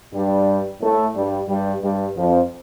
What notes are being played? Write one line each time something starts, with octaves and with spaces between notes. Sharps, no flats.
G2 G3
A2 A3
G2 G3
G2 G3
G2 G3
F2 F3